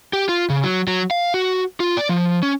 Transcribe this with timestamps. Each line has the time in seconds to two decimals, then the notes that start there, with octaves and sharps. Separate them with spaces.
0.13 G4
0.29 F4
0.50 C#3
0.64 F#3
0.88 F#3
1.11 F5
1.34 F#4
1.80 F4
1.97 D5
2.09 F3
2.43 C#4